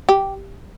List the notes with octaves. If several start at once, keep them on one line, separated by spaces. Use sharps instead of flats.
G4